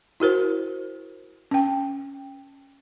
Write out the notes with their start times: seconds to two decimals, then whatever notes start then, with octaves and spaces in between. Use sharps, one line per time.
0.20 E4 F#4 A#4 C5
1.51 C#4 G5